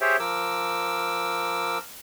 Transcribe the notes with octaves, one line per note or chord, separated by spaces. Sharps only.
G4 G#4 C5 C#5 E5 G5
F3 A#4 D6 E6